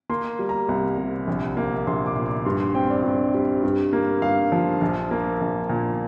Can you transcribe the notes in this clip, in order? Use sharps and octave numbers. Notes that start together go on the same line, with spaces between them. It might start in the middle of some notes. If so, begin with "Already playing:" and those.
A#3 C6
G3
A#5
C2
C3
A#1
A#3
A#1 C6
D6
A#2
D6
G2 C6
C6
C4 G5
D5
G2
G3
G2
A#3
G2 F5
F3
A#1
A#3
A#1
A#2